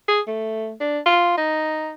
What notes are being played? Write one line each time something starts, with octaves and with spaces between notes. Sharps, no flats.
G#4
A3
D4
F4
D#4